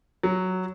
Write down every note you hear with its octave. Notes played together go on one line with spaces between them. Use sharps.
F#3